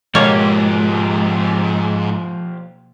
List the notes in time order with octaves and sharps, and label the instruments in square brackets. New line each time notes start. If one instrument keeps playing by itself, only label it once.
[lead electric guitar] G#2 [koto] B2 A#3 C#5 [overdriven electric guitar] F3 G4